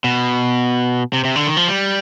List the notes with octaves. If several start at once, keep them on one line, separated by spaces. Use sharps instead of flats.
B2
C3
C3
D3
D#3
F3
G3